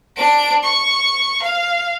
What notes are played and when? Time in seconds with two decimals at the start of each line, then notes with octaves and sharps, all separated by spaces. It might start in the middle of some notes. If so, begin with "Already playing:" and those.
0.17 D4 D7
0.63 C#6
1.42 F5